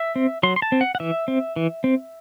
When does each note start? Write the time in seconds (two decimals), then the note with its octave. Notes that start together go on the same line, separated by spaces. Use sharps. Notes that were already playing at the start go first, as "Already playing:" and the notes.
Already playing: E5
0.16 C4
0.43 F#3 C6
0.56 C6
0.62 A5
0.72 C4
0.81 F#5
0.95 F#5
1.00 E3 E5
1.28 C4
1.56 E3
1.84 C4